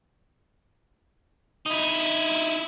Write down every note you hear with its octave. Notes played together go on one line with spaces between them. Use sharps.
D#4 E4